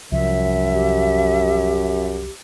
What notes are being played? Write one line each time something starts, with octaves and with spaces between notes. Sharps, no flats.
C2 F#2 F3 E5
G4